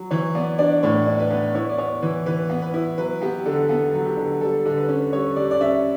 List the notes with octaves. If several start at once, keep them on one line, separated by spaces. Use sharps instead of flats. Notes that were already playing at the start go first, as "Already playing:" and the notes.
Already playing: F#3
E3 C#5
B3 D5
D4 D5
A2 C#5
D4
B4
B3
E4 C#5
D5
B3 C#5
E3 B4
E3 B4
B3
B4
E4
F#3 B4
B3 G4
D3 A4
B3 A4
F#3
G4
D3
G3 A4
D3
B4
C#4
G3 C#5
G3 D5
D5
C#4 E5